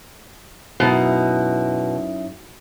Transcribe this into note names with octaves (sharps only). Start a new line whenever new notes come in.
F#2 B2 D#4 E4